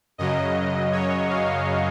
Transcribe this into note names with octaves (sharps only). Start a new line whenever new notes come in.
F#2 C#3 F#3 D#5
C#5
F5